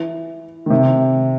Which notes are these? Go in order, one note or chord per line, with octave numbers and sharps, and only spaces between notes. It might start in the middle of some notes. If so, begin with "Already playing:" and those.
Already playing: E3
D#3
C3